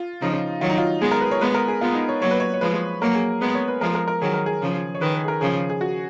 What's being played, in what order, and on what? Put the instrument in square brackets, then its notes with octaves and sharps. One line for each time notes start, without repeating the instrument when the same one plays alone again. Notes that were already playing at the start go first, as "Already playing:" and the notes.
Already playing: [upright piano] F4
[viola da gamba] C#3 F3 [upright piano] D#4
[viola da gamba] D#3 F#3 [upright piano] F4
[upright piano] D#4
F4
[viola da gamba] G#3 B3 [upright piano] G#4
[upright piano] A#4
B4
C#5
[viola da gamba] G#3 B3 [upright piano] B4
[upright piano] A#4
G#4
[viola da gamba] G#3 B3 [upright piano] F4
[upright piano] D#4
C#5
[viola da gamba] F#3 A#3 [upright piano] C#5
[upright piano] B4
C#5
C#5
[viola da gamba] F3 G#3 [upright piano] B4
[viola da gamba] F#3 A#3 [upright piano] A#4
[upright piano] G#4
[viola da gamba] G#3 B3 [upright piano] B4
[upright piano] C#5
B4
[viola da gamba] F3 G#3 [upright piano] A#4
[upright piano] A#4
A#4
[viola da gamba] D#3 F#3 [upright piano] G#4
[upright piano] A#4
G#4
[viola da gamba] C#3 F3
[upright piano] C#5
[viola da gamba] D#3 [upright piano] B4
[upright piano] B4
G#4
A#4
[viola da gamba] C#3 F3 [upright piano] G#4
[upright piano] G#4
F#4